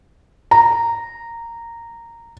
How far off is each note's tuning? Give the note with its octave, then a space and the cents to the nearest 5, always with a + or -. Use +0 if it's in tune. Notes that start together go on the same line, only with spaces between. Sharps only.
A#5 -10